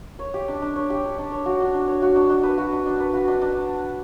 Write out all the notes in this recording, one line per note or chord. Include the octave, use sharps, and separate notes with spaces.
C#5
G4
D4
D4
C#5
G4
D4
D4
C#5
F#4
D4
D4
C#5
F#4
D4
D4
B4
F#4
D4
D4
B4
F#4
D4
D4